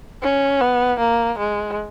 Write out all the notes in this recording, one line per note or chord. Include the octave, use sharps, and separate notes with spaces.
C#4
B3
A#3
G#3